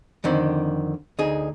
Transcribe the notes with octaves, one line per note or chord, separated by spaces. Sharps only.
F2 D3 D#3 C4
D2 D#4 G#4